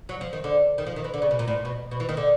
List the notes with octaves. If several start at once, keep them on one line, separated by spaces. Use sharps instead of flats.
F#3
F3
D#3
D3
D#3
F3
D#3
E3
D3
C#3
B2
A#2
A2
B2
B2
E3
D#3
D3